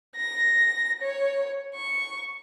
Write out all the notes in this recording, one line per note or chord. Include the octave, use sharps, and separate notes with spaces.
A#6
C#5
C#6